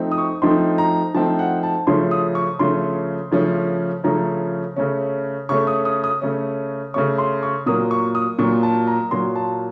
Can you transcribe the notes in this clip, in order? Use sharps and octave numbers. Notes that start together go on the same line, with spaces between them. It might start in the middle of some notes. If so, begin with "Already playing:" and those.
Already playing: F3 A3 C4 D#4
D#6
C#6
F3 A3 C4 D#4 C6
A#5
F3 A3 C4 D#4 A5
F#5
A5
C#3 F3 A3 C#4 C6
D#6
C#6
C#3 F3 A3 C#4 C6
C#3 F3 A3 C#4
C#3 F3 A3 C#4 A#5
C#3 A3 C#4
C#3 A3 C#4 C#6
D#6
D#6
D#6
C#3 A3 C#4
C#3 A3 C#4 C#6
C6
C#6
A#2 F#3 A#3 D#6
C#6
D#6
A#2 F#3 A#3 C#6
A5
A#5
A#2 F#3 A#3 C6
A5